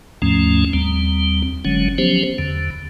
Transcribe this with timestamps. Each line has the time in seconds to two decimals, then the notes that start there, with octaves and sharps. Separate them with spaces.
0.22 D#2 G#2 F3 A3 C#4
0.73 D#2 G3 C4
1.65 F#1 D3 F#3 G#3 C#4
1.98 F3 F#3 B3 C#4 G4 C5
2.38 E2 D3